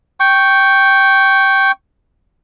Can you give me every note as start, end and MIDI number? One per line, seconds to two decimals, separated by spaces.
0.20 1.71 79
0.20 1.71 85